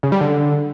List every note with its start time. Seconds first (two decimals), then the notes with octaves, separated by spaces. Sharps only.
0.03 C#3
0.12 G3
0.21 D3